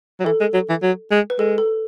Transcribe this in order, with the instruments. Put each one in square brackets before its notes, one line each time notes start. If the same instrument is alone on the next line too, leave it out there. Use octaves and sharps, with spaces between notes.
[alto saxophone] F#3
[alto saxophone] E3 [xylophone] A4
[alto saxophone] G#3
F#3
E3
F#3
G#3
[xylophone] B4
[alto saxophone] G#3 [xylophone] A4
[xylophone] A4